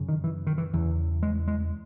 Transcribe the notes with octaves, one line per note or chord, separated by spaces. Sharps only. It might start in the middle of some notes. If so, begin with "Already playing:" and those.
Already playing: F#2 C#3
D#3
E3
D#3
E3
E2 C#3 E3
G#3
G#3